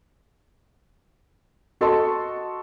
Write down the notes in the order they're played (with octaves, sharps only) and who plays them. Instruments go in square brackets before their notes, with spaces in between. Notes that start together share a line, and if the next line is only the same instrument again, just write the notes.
[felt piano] F#4 A4 D#5 A5 C6 C#6